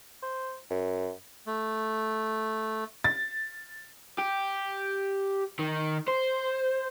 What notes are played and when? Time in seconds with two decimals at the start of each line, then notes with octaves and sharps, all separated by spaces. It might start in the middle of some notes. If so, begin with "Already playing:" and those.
0.22 C5
0.70 F#2
1.47 A3
3.04 A6
4.18 G4
5.59 D#3
6.08 C5